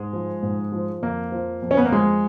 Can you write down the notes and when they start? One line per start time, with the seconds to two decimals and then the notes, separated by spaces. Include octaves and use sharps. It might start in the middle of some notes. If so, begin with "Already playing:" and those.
Already playing: G#2 G#3
0.13 F3
0.42 G#2
0.72 F3
1.02 F2 A#3
1.32 F3
1.62 F2
1.71 C#4
1.77 B3
1.85 A#3
1.91 F3 G#3